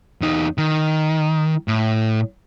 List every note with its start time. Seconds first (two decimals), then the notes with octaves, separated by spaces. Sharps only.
0.21 E2 D#4
0.58 D#3
1.68 A2